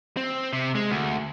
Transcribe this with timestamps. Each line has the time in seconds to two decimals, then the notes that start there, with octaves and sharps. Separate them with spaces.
0.17 C4
0.53 C3
0.75 G#3
0.90 D2